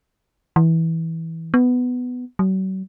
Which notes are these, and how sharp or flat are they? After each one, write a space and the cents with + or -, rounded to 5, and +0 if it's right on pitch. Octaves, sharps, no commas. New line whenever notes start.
E3 -15
B3 +10
F#3 +40